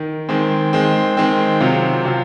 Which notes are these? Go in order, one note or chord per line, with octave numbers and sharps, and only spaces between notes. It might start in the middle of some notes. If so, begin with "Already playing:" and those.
Already playing: D#3
D#3 G#3 C4
D#3 G#3 C4
D#3 G#3 C4
C3 F#3 C4 F4
C3 F#3 C4 F4